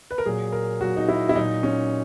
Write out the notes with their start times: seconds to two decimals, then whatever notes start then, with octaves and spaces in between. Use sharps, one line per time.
0.11 B4
0.18 A#4
0.26 A#2 F#3 G#4
0.52 A#4
0.81 A#2 F#3 F#4
0.96 D#4
1.08 E4
1.29 E4
1.36 A#2 F#3 D#4
1.63 C#4